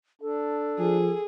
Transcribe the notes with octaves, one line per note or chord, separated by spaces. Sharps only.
D4 A4
F3 G#4